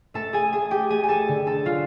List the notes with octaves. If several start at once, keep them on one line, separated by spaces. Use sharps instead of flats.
A3 A4 A5
G#4 G#5
A3 G#4 G#5
G4 G5
A3 G#4 G#5
G#5
A4 A5
D3
A4 A5
F#3 F4 F5